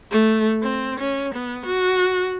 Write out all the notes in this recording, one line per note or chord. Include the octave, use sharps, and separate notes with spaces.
A3
C4
C#4
B3
F#4